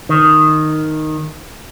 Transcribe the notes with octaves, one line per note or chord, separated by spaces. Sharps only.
D#3